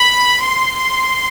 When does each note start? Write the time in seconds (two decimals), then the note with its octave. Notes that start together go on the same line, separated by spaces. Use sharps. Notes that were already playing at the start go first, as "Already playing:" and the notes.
Already playing: B5
0.43 C6